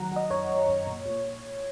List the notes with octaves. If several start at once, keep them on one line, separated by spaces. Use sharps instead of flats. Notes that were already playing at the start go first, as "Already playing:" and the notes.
Already playing: D#3 F#3 F#5 A#5
F#3 D#5
F#2 C#5
F#2
F#2
A#2
A#2